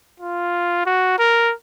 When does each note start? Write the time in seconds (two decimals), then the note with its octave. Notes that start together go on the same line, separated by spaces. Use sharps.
0.20 F4
0.86 F#4
1.19 A#4